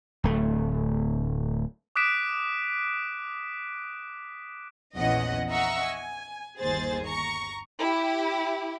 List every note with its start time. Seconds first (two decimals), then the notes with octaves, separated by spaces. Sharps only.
0.24 D1 A3
1.96 D6 D#6 F#6 B6 D7 E7
4.96 A#1 E2 E3 C#4 D#5 F#5
5.49 D#5 E5 F#5 A#5 C#6 E6
5.87 G#5
6.59 G1 D#2 G#4 C5 A6
7.05 A#5 C#6
7.79 E4 G4